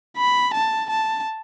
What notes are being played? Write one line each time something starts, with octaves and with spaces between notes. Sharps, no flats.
B5
A5
A5